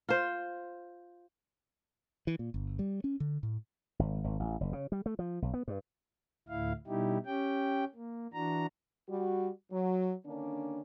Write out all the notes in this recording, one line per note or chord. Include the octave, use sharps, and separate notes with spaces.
F4 C5
E3
A#2
G1
G3
C#4
D3
A2
G#1
G#1
A1
F#1
C#3
G3
A3
F3
B1
B3
G2
D2 A2 E4 F5
B2 G3 D#4 E4 G4
C#4 G4 G5
A#3
E3 D4 F#4 A#5
G3 F#4
F#3
D3 D#3 A#3 C#4 D4